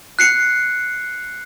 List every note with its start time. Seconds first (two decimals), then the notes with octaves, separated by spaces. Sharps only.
0.19 F#6 C7 C#7